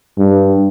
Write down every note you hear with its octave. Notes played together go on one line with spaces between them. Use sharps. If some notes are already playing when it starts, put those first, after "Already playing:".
G2